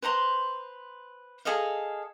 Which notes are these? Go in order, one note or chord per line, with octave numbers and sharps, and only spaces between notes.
B4 C5 A#5 C6
G#4 A4 D#5 F5